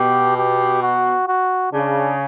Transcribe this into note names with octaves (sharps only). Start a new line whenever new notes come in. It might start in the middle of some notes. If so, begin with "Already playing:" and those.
Already playing: B2 G4
G4
F#4
F#4
C#3 D4